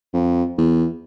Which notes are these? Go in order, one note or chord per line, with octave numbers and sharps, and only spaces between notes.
F2
E2